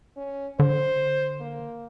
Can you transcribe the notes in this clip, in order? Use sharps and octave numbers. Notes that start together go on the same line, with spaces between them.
C#4
D3 C5
A#3